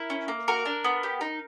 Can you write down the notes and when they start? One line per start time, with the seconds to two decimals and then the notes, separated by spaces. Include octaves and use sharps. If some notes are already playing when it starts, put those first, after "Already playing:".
Already playing: E4 A#4
0.10 C#4
0.28 A#3
0.48 F#4 A#4
0.65 D4
0.84 B3
1.03 G4
1.21 D#4